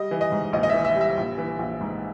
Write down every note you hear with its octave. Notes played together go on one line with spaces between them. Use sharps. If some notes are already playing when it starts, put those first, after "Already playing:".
Already playing: G3 D#5
E3
D#5
G#2
A#1 D#5
D#5
E3 E5
E5
G3
E5
A#1
E3
A#1
G#2